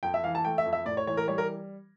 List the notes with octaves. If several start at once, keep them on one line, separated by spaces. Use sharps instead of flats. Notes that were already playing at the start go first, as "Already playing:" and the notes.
F2 G5
E5
E3 F5
A5
A3 G5
E5
F2
E5
A2 D5
C#5
E3 C#5
A#4
G3 C#5
A#4